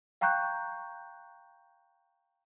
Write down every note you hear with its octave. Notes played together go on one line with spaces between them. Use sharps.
F5 G5 A#5 C#6 F#6 G6